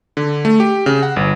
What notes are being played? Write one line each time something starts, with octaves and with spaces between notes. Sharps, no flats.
D3
A3
G4
C#3
F#5
G1